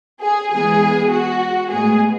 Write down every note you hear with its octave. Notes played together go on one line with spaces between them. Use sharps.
G#4
E3 G#3 B3 G#4
F#4
A2 G#3 B3 G#4